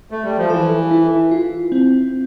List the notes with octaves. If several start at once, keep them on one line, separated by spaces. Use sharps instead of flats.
A3
G3
F3
E3 A4
E4
F4
C4